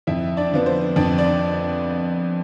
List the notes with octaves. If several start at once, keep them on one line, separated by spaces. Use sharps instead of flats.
F2 E4 E5
D4 D5
D3 F3 B3
C5
F2 D4 D5
D4 D5